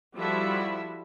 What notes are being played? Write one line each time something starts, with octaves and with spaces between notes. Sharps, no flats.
F3 G3 E4 F#4 A4 E5